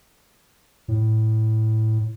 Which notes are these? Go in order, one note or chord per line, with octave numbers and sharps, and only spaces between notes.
A2